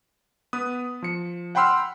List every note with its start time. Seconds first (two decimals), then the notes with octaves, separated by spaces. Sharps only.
0.53 B3 B4 D#6
1.02 F3 C#7
1.55 F#5 G5 B5 C6 E6 F6